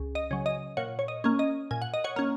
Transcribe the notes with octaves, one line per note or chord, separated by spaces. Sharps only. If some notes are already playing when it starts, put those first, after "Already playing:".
Already playing: C#2
D#5
C#3 F#3
D#5
A#2 C#5 F#5
C#5
D#5
A#3 C#4
D#5
A#2 G#5
F#5
D#5
C#5 F#5
A#3 C#4